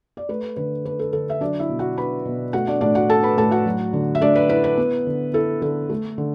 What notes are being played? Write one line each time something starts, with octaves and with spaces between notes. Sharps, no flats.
D5
A3 B4
D3 B4
D4 B4
A4
D3 A4
E5
F#3 D4 D5
E4 E5
B2
F#4 F#5
D4 B4 B5
B2
A3 F#4 F#5
D4 D5
A2 D4 D5
F#4 F#5
D4 A4 A5
B4 B5
A2 A4 A5
F#4 F#5
F#3
D3
E5
A3 D4 D5
B4
E4 B4
B4
B3
D3
E4 A4
D3 A4
A3
D3